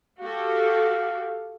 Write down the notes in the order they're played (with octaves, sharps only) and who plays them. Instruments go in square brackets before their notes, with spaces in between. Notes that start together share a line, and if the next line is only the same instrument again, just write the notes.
[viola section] F#4 G4 A4 [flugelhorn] F5